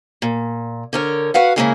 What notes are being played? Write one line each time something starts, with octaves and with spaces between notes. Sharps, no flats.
A#2
D3 A#4 C#5
F#4 B4 F5 F#5
C#3 F3 G#3 A#3 E4 G#4